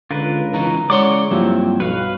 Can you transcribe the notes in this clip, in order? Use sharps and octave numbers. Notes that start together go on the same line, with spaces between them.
C#2 D3 F4 A#4 B4
C#3 E3 D#4 A#5
C#3 G#3 E4 C#5 D5 F#5 C6 D6
G2 F3 F#3 A#3 C4 E4
B1 F#4 B4 F5